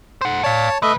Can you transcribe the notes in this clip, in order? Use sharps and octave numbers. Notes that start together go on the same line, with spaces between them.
C5 F#5
C#5 D5 F5 A5
C2 A3 B4 D#5 E5